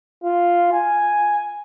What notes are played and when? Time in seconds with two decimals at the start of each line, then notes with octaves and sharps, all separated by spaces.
0.24 F4
0.73 G#5